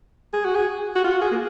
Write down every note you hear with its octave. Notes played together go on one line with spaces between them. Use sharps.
G#4
F#4
G#4
F#4
F4
F#4
G#4
A#3